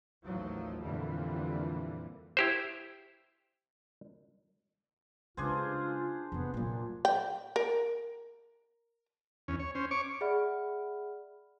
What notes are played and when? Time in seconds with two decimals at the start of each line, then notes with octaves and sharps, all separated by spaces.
0.24 A1 D#2 F3 F#3
0.82 F2 A#2 D3 E3 G3
2.37 E4 G4 C5
5.37 C#3 G#3 D4 F4 G#4 C5
6.32 F2 C3 B3
6.54 A#2 F#3 A#3
7.05 G5
7.56 A#4
9.48 E2 C#4
9.60 C#5
9.75 C#4 C5
9.91 C#5 C#6 D6
10.21 G#4 D5 E5 F#5 B5 F6